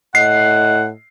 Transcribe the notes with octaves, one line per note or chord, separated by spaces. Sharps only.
A2 D#5 F#5 C7